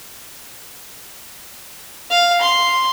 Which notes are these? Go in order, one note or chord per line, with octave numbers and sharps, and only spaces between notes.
F5
C6